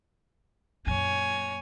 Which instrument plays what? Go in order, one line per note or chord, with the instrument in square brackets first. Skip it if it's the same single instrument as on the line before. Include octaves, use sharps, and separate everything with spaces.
[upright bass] F#2 A#2 [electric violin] C#5 G#5